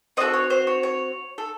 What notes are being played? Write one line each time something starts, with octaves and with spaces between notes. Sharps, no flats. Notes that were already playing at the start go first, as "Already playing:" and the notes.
C4 F#4 A4 D#5
C#5
C5
C#5
C#5
A4